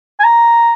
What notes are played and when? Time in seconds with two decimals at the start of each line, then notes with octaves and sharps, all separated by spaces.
0.20 G#5
0.24 A#5